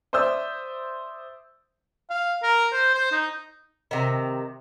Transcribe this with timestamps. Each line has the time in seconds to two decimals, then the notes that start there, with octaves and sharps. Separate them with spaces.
0.13 C5 D5 E5 D#6 E6 G6
2.10 F5
2.43 A#4
2.72 C5
2.95 C5
3.12 D#4
3.91 C3 D#3